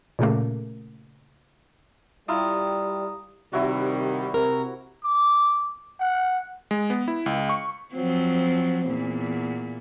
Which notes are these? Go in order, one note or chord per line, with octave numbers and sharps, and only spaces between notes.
A#2 C#3 A3 A#3
G3 E4 F4 A#5 D#6
C3 D#3 G3 E4 F#4
C3 A#4
D6
F#5
G#3
B3
E4
C#2
C#6
F3 F#3 C4
E2 A#2